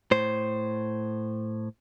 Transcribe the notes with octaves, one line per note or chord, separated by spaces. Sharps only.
A2 C5